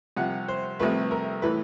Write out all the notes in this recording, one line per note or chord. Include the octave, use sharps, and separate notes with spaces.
C2 C3 F3 F#5
C5
C2 C3 F3 A3 B4
A#4
A2 E3 B4